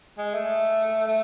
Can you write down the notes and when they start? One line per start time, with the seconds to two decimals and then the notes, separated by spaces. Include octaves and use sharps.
0.18 G#3
0.34 A3
1.07 A3